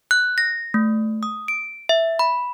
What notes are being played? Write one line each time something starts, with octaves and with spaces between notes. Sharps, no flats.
F#6
A#6
A3
D#6
D7
E5
B5